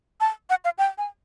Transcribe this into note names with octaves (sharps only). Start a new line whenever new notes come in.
A5
F#5
F5
G5
G#5